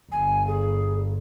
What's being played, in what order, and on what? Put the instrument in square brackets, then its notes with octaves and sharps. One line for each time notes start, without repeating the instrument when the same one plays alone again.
[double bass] G1 [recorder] G#5
[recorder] G#4